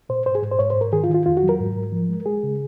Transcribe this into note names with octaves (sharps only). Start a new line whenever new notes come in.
A#2 C5
G#2 C5
G#4
G#2
C5
G#2 C#5
C5
G#2
A#4
D#3 G#4
F4
D#3
F4
F2 F4
F#4
F#3
A#4
G#2
G#2
F3
G#3
G#3 G#4
C#3